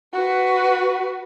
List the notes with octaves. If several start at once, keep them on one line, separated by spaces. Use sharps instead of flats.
F#4 B4